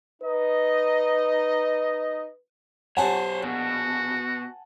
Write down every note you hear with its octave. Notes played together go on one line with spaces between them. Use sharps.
D#4 B4 D#5
B1 F#3 G4 C5 C#5 F#5 G#5 A5
A#1 B2 F#4